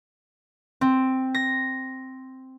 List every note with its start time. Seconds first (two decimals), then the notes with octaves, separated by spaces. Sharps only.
0.81 C4
1.35 A#6